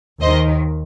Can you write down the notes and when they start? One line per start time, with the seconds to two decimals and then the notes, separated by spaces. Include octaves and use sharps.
0.21 D#2 D#3 C5 D#5